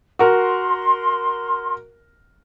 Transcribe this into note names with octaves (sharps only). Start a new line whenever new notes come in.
F#4 A#4 C6